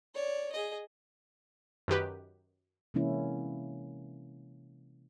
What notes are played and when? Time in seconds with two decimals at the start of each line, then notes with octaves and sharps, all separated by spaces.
0.15 C#5 D5
0.53 G#4 D#5
1.88 F#2 D#3 G4 B4
2.94 C3 E3 G#3 A#3 C#4 E4